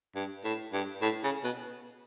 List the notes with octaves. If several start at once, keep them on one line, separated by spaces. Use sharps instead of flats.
G2
A2
G2
A2
C#3
B2